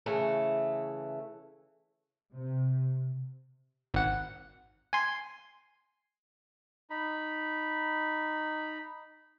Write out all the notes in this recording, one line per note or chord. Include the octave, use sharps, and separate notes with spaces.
C#3 E3 A3
C3
G#1 F#5
G#5 C6
D#4 B5